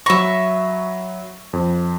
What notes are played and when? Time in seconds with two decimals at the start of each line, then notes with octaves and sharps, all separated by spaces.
0.06 F#3 E5 B5 C#6 A#6
1.53 F2